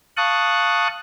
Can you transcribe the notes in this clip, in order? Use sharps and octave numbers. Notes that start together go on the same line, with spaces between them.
F5 A5 C#6 D#6 F#6